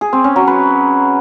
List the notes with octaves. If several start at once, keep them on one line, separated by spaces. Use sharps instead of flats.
G#4
C4
C#4
F#3
B4